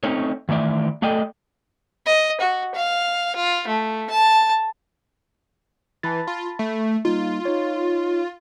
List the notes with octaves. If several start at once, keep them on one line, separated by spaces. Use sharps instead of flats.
A3 C4 C#4 D#4 C#5
D#3 E3 A3 D5 E5
A3 A4 D5 D#5 G5
D#5
F#4
F5
F4
A3
A5
E3 A5 B5 A6
F4
A3
G3 A#3 D#4 F4
D#4 C#5